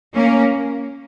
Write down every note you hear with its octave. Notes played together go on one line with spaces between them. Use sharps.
A#3 C#4